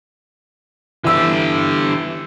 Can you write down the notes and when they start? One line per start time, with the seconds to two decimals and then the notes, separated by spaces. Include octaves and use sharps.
1.04 D3 E3 G4 E6